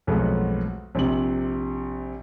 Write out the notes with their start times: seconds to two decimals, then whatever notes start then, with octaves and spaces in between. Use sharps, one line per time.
0.07 B1 F2 F#3 G#3 A3 B3
0.95 A#1 C3 F#7